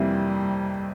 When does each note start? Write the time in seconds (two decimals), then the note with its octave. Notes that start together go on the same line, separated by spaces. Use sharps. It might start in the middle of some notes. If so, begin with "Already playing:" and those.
Already playing: F2 C3 E3 G3 A#3 E4